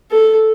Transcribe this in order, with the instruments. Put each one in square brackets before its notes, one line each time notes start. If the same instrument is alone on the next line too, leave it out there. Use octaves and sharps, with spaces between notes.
[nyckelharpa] A4